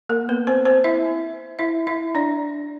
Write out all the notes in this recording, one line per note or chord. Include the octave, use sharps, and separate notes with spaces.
A#3 A#4
B3 B4
C4 C5
C4 C5
E4 E5
E4 E5
E4 E5
D4 D5